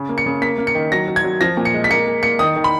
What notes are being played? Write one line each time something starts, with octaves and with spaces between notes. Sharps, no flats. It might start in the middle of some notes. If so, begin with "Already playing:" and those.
Already playing: C#3
A#3
C#7
C#3
A#3 B6
A#3
C#7
D#3
F#3 A#6
F#3
G#6
F#3
F3 A#6
A#2
C#7
G#3
B6
A#3 C#7
A#3
A#3 C#7
D#3 D#6
D#3
B5